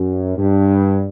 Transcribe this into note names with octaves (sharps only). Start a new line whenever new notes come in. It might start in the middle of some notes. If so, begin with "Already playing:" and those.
Already playing: F#2
G2